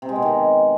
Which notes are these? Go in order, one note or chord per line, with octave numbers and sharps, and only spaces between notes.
C3
G#3
B2
D#3